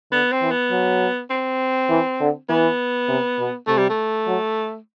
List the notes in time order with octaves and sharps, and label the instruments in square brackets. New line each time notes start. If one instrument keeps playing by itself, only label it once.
[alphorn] D3 [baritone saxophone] B3
[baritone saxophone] C4
[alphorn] E3
[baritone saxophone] B3
[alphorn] F#3
[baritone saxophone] C4
[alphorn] E3
D3
[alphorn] E3 [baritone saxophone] B3
[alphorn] C3
B2
[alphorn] C3 [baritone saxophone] A3
[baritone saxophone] G3
A3
[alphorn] F#3